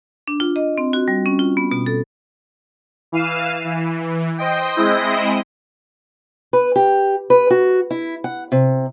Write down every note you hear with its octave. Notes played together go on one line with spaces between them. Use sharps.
D4
F4
D#5
C4
F#4
G3
C#4
F4
B3
B2
A4
E3 F5 D#7 E7
E3
C5 D#5 G5
G#3 C4 E4 D#5
B4
G4
B4
F#4
E4
F#5
C3